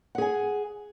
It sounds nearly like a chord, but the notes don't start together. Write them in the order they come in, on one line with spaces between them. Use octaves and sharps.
F#5 G#4 G#5